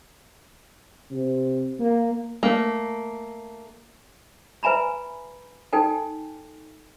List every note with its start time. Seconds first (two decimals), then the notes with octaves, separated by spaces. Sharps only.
1.11 C3
1.79 A#3
2.43 A3 A#3
4.63 B4 E5 G#5 A#5 B5
5.73 D#4 A4 G5 G#5